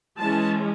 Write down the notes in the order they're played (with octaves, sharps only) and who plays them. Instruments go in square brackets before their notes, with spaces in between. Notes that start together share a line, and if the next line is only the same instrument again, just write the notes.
[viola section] E3 G#3 C#4 A5